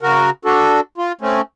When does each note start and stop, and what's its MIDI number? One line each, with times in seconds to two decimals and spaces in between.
0.01 0.30 49
0.01 0.30 66
0.01 0.30 70
0.45 0.80 62
0.45 0.80 66
0.45 0.80 69
0.98 1.12 65
1.21 1.41 57
1.21 1.41 60
1.21 1.41 61